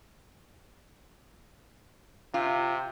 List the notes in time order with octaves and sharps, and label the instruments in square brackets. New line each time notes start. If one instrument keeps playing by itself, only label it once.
[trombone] C3 [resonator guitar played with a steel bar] F4